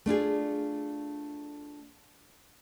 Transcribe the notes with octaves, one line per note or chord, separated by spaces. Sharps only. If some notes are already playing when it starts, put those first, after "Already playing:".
A3 D4 F4 G#4